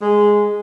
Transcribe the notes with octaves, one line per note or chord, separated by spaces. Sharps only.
G#3